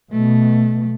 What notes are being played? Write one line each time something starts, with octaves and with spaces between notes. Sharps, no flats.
B2 A3